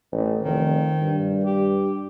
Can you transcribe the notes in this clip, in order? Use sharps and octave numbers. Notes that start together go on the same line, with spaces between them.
A1
F1 D#3
G2
G4